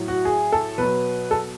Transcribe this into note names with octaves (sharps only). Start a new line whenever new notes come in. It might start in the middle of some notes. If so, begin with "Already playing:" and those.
Already playing: A2 F#3
F#4
G#4
A4
B2 F#3 B4
A4